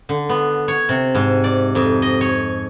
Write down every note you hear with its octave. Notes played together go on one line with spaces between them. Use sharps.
D3
B3
C#5
C3
G#2
D5
F2
D#5
C#5